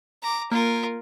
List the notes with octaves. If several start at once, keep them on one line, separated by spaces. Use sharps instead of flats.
A#5 D6
A#3 F4 A#4